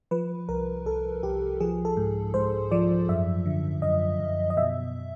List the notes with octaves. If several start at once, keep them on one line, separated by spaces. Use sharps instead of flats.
F3 B4
C2 A#4
C2 A4
C2 G4
F3 G#4
A4
G#2
G#2 C5
F3 D5
F#2 E5
D3
F#2 D#5
F#2
D#5
B2 E5